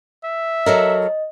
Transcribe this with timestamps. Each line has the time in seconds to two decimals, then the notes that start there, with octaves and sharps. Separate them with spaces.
0.24 E5
0.66 F#3 A4 A#4 D#5